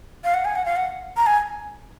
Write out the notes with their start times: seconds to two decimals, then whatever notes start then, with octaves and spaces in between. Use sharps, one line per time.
0.24 F5
0.34 F#5
0.45 G#5
0.56 F#5
0.66 F5
0.76 F#5
1.17 A#5
1.26 G#5